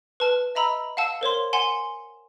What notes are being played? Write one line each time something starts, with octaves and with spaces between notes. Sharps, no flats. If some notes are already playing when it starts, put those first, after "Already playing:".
B4 A5 F6
D#5 E5 A#5 B5 E6
F5 F#5 A5 E6
A#4 C5 C#5 C6
F#5 G#5 C6 E7